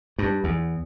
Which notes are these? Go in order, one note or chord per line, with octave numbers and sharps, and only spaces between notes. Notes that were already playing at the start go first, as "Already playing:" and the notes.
G2
E2